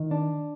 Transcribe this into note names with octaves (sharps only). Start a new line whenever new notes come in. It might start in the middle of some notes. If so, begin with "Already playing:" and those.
Already playing: D#3
D4